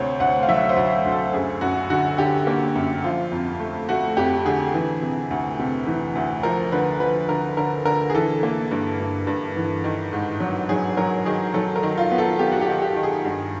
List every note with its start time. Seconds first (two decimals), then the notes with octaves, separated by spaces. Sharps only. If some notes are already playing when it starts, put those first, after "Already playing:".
Already playing: D2 C3 C5 C#5
0.20 D2 F#5
0.43 F5
0.48 F#3 E5
0.69 C5
0.76 D2
1.05 D2
1.12 A4
1.33 F#2 G#4
1.61 F#2 F#4
1.90 D3 F#4
2.18 D3 G4
2.47 A#3
2.75 F#2
3.04 F3 F4
3.32 F2
3.60 A3
3.89 A3 F#4
4.17 F2 G4
4.45 D3 G#4
4.74 E3
5.02 C3
5.31 D2
5.59 C3
5.87 E3
6.15 D2
6.43 F3 A#4
6.72 D3 B4
7.00 F3 B4
7.29 D3 A#4
7.57 D3 A#4
7.85 D3 A#4
8.10 G#4
8.15 E3 A4
8.43 A#3
8.71 G2
9.00 G2
9.27 G2
9.56 E3
9.84 D#3
10.13 G#2
10.40 F#3
10.69 F#3 G#4
10.97 F#3 A#4
11.25 D#3 G#4
11.54 F#3 A4
11.76 A#4
11.83 D#3
11.98 F4
12.11 B3
12.18 A4
12.39 B3 G4
12.52 F#4
12.61 G4
12.68 D#3
12.82 G4
12.96 D#3
13.03 G#4
13.25 G2